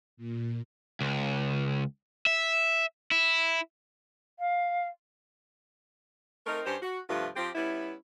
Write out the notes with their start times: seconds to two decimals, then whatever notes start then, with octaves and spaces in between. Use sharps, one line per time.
0.17 A#2
1.01 C#2
2.27 E5
3.11 E4
4.39 F5
6.46 A3 C4 D#4 A#4
6.66 G2 C#4 G4 C5
6.82 F#4
7.09 G2 C3 F3 A3 F4 B4
7.36 F3 C4 F4 G4
7.55 G3 B3 C#4 E4